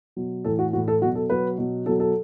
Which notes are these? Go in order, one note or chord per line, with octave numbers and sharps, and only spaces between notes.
B2 F#3
A2 E3 A4
F#4
A2 E3 F#4
A4
B2 F#3 F#4
A4
B2 F#3 B4
B2 F#3
B2 F#3 A4
A4